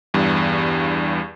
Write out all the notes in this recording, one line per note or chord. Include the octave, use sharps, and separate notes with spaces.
E2 G2